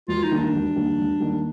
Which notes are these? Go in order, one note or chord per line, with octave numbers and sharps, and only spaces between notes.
E1 F4
D#4
D#2 D#3 G3
D4
E1
D#2 D#3 G3
E1
D#2 D#3 G3